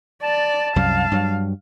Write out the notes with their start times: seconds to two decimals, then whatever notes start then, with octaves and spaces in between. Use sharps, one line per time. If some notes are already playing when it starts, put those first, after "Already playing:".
0.23 D5 A5
0.76 C2 F#2 G3 F5
1.11 G2 F#3